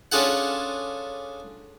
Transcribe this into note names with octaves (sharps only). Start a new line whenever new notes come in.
C#4 D4 F4 G#4 A4 F#5